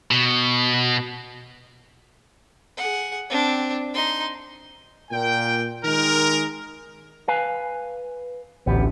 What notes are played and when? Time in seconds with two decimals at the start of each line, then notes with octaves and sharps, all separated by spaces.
0.11 B2
2.77 G#4 F#5
3.30 C4 D4
3.94 D#4 C6
5.11 A#2 G5
5.85 D#3 G#3 A#4
7.28 B4 F5 G#5
8.66 A1 D2 B3 G4